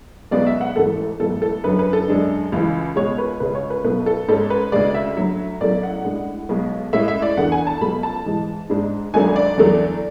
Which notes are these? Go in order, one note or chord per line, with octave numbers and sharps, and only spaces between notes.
B1 B2 G#3 B3 D5
E5
F#5
A1 G#2 E3 A3 A4
A1 G#2 F#3 B3 A4
A4
F#2 D3 F#3 C#4 B4
B4
A4
F#2 D3 G#3 D4
C#2 C#3 E3
C#2 B2 G#3 C#5
B4
C#2 C#3 G#3 C#4 B4
C#5
B4
B1 B2 A3 B4
A4
G#2 G#3 C#4 A4
B4
D2 C#3 G#3 D5
E5
D2 D3 F#3
B1 A2 F#3 A3 C#4 D5
F#5
A2 G#3 D4
B1 B2 G#3
A2 G#3 C#4 E5
E5
D5
E2 D3 A3 F#5
G#5
A5
C#2 B2 F#3 A3 C#4 B5
A5
G#2 E3 G#3
G#2 G#3 D4
G#1 G#2 F#3 A3 D4 G#5
D5
E2 D3 F#3 A3 D4